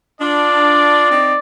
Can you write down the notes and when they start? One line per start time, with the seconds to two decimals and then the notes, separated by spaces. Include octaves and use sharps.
0.20 D4 F4 D5
1.11 C4 D#4